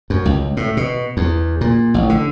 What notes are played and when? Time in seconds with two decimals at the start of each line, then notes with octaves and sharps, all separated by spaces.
0.10 F#2
0.25 C#2
0.57 A2
0.77 B2
1.17 E2
1.61 A#2
1.94 A1
2.09 D3